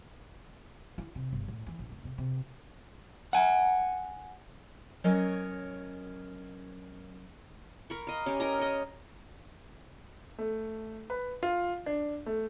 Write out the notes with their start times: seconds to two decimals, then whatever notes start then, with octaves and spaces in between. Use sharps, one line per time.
0.98 E4
1.15 C3
1.33 G1
1.48 A2
1.67 E3
1.79 A#1
1.92 F1
2.05 C3
2.18 C3
3.33 F#5 G#5
5.04 F#3 C#4 A#4 C#5 D#5
7.90 A#4 B5 C#6
8.07 D#5 F5
8.26 C#4 G4
8.40 A#4 D#5 A#5
8.59 C#5 D#5
10.38 A3
11.10 B4
11.43 F4
11.86 D4
12.26 A3